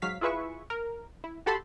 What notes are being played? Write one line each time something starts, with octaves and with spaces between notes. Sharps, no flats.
G#2 F#3 F5 B6
E4 F4 G#4 B4 E5 C#6
A#4
E4
F#4 G4 A4 A5 B5 C6